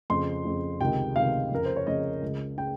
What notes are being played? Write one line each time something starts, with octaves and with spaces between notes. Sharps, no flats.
F2 C#3 C6
F2 C#3
C#2 C3 D#3 G5
C#2 C3 D#3 F5
F2 C#3 A#4
C5
C#5
F2 C#3 D#5
C#2 C#3
C#3 G5